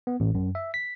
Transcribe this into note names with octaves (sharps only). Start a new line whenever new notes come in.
B3
A1
F#2
E5
B6